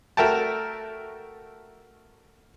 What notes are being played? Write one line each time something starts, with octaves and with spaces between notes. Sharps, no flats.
A3 F#4 A#4 E5 G5 A5